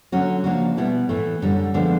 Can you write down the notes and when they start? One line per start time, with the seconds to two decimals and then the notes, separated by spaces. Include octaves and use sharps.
0.12 D3 F#3 A3 C#4 F#4
0.44 C#3 F3 A#3 D4 F#4
0.77 B2 G3 B3 E4
1.09 A2 E3 A3
1.42 F#2 D3 G3
1.74 D3 F3 G#3 B3 D4